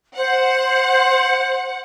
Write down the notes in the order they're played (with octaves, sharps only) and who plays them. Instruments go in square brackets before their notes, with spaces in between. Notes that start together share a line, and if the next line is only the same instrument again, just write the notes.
[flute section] C5 [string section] F#5